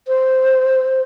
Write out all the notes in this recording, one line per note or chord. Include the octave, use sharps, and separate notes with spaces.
C5